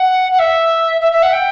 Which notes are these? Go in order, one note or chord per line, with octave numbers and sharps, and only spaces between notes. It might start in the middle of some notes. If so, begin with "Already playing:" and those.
Already playing: F#5
F#5
E5
E5
E5
F#5
G5